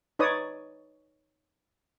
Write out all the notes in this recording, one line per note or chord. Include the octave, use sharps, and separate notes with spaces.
D#4 B4 C#5 D5 D#6